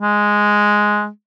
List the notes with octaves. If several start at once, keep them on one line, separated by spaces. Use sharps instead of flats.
G#3